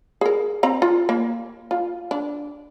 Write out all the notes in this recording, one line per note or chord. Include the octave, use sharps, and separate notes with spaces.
G#4 A#4
C4 A#5
F4
A#3
F4
D4